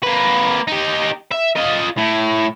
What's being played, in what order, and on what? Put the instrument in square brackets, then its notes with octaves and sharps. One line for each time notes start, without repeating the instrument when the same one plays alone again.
[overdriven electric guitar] A#3 B4
D#4 G4
E5
F4 D#5
A2